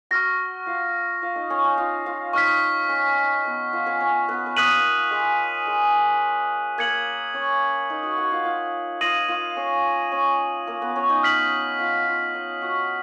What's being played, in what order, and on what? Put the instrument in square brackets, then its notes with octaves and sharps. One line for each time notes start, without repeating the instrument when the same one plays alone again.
[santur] F#4 F#5 [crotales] C#6 F6 A#6
[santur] F4 F5
F4 F5
D#4 D#5
C#4 C#5
D#4 D#5
F4 F5
F4 F5
[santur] D#4 D#5 [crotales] C#6 F6 B6
[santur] D#5
C#4 C#5
B3 B4
F4 F5
C#4 C#5
C#4 C#5
B3 B4
B4
[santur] A#3 A#4 [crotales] D#6 F#6 B6 D#7 F#7
[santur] G#3 G#4
G#3 G#4
[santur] A#3 A#4 [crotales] G#6 C#7 F#7
[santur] C#4 C#5
D#4 D#5
F#4 F#5
F#4 F#5
F4 F5
F4 F5
[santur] F4 F5 [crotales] D#6 A#6 D#7 F#7
[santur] F4 F5
C#4 C#5
C#4 C#5
A#3 A#4
B3 B4
C#4 C#5
D#4 D#5
[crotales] F6 B6 F#7
[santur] F4 F5
F4 F5
D#4 D#5
F#4 F#5